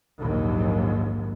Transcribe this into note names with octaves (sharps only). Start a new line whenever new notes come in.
A#1 D#2 G#2 F#3